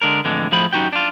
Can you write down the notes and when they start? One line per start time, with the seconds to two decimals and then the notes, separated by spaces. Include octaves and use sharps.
0.01 D3 G#3 D4 A#4
0.25 F2 A2 D3 E3 G#3
0.52 A2 F3 G#4 C5 B5
0.73 F#2 D#4 F#4 G4 G5
0.93 D4 F4